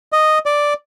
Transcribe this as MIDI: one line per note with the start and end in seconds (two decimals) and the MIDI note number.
0.12 0.39 75
0.46 0.74 74